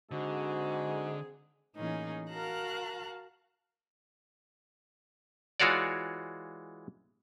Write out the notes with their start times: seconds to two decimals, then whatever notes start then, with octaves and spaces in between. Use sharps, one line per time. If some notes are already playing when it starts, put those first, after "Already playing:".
0.11 G#2 D3 C4 F#4 G#4
1.75 A2 E3 A#3 C#4 D#4 G#4
2.29 F#4 A#4 F5 A5 A#5 F#6
5.60 E3 G#3 F4 F#4 C#5 D5